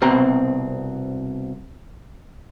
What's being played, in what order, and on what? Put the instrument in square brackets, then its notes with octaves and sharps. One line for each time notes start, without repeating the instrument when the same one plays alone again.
[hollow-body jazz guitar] C2 B2 C4 A#5